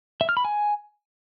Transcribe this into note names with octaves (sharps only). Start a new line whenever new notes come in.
E5
F6
B5
G#5